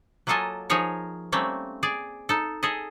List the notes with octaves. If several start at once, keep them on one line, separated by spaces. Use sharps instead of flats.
F#3 A#3 F4 A4 D#5 G#5
F3 D#4 G#4 A#4 C#5
G3 A3 A#3 C4 C#4
G#4 D5
D#4 A4
G#4 A4 D#5